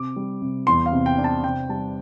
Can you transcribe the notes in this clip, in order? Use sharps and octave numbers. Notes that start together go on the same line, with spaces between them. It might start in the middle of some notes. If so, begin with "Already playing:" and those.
Already playing: C3 D6
G3
C3
E2 C6
F5
C3
G5
D4
A5
C3 G5
G3 A5